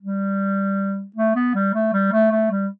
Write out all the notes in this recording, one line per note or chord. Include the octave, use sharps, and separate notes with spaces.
G3
A3
B3
G3
A3
G3
A3
A3
G3